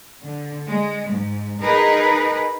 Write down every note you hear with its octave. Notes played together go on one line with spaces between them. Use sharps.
D3
G#3
G#2
D#4 G#4 A#4 B4